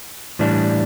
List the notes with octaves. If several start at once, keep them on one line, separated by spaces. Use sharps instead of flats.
A2 E3 G3 D4